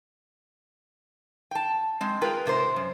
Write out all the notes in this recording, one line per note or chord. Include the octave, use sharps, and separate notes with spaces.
G5 A5
G#3 C4
F4 G#4 A#4 B4 G5
G#2 C3 A#4 C5
F#2